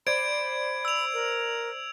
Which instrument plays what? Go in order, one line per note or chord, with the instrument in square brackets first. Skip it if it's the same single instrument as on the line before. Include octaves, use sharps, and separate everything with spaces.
[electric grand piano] C5 D5 [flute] B5 [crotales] G#6 D7
[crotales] E6 F7
[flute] A#4